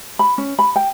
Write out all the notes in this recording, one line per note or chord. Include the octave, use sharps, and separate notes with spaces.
B5
C#4
B5
G5